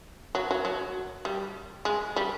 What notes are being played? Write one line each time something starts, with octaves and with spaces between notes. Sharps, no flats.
F#3
F#3
F#3
G3
G#3
G3